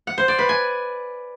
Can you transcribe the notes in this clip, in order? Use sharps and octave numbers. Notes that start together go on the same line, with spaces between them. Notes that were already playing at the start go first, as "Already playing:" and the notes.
F#5
C5
D5
B4
G#5